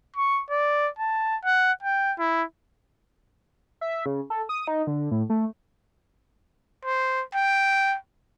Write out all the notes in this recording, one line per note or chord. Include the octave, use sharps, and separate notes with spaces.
C#6
D5
A5
F#5
G5
E4
E5
C#3
A4
D#6
D#4
D3
A2
A3
C5
G5